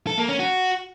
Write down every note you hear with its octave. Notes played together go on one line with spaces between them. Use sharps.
A4
A#3
C#4
F#4